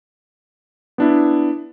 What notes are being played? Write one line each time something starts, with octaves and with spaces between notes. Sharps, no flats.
B3 D4 E4